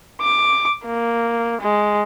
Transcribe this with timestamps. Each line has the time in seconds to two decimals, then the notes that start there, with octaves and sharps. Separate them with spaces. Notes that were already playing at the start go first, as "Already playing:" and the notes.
0.22 D6
0.86 A#3
1.62 G#3